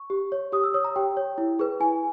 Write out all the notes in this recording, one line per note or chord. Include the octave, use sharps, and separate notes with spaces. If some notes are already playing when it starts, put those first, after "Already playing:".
Already playing: C#6
G4
C#5
G4 D#6
E6
C#5 D#6
A#5
G4 G5
C#5
E4
G#4 B4
E4 G#5